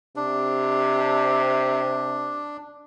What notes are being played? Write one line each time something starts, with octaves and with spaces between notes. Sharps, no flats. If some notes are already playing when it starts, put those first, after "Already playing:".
C3 D4